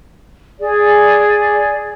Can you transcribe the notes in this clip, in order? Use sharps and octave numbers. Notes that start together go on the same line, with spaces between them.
G#4 D5